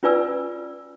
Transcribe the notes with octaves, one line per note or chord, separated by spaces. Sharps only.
C#4 F4 B4 D5 G#5 E6